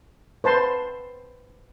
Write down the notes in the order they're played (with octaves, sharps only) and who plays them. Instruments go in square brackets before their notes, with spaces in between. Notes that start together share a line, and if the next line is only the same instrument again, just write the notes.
[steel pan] B4 C5 A5 C6